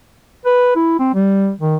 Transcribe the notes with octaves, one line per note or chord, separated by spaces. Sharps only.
B4
E4
C4
G3
D#3